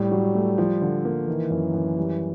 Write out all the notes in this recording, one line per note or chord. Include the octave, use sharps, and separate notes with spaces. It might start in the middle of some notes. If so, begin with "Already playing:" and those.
Already playing: A2 G3
F#3
A3
F3
D3
A#3
D#3 E3
F#2
F#2
G3